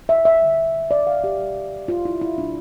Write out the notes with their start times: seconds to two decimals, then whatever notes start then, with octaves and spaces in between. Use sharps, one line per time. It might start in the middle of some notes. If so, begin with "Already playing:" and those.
0.09 E5
0.25 E5
0.42 D3 G3
0.91 D5
1.07 F5
1.24 G4
1.40 B2 G3
1.88 F4
2.05 E4
2.21 E4
2.38 B2 G3 D4